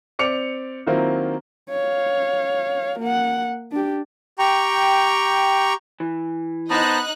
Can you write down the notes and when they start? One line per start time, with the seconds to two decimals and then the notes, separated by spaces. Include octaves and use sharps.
0.19 C4 D5 D6 C#7 F7
0.87 D#3 F#3 A#3 C4 E4 F4
1.70 C#5 F5
3.00 A#3 F#5
3.72 D4 G4
4.39 G4 G5 A#5 C#6
6.00 E3
6.70 B3 D#4 C5 D#5 A5 A#5 F#6